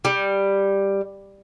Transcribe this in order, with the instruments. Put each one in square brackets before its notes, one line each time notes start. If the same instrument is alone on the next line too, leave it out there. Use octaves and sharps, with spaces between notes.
[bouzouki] G3